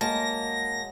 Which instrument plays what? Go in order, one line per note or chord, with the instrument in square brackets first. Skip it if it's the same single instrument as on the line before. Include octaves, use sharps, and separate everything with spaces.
[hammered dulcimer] F#3 G#3 [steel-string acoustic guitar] A#3 [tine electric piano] A5 [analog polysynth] A#6